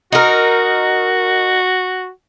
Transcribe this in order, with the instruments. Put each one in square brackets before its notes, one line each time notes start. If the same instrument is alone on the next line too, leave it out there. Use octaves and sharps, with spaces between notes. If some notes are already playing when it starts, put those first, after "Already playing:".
[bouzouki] D#4 A#4 [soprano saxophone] F#4